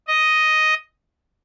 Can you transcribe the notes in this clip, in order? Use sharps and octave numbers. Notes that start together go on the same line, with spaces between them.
D#5